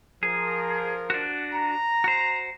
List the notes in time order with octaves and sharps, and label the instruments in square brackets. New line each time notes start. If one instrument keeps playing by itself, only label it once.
[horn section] F3 A#4 [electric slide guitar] G#4
[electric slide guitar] D4 F#4
[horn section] A#5
[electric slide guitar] F#4 C5